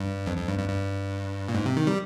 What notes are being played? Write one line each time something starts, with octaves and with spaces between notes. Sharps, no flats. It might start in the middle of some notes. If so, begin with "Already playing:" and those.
Already playing: G2
F2
F2
G2
G2
G2
A#2
G#2
C3
D#3
G3